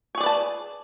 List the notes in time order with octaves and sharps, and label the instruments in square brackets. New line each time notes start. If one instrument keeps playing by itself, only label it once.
[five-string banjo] C#5
G#4
D5
B4
A5